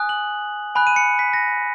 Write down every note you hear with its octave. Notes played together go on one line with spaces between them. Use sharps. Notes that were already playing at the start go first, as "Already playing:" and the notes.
Already playing: G#5 D#6 F#6
F#7
G#5 B5 F#6
D#7
C#7
B6
A#6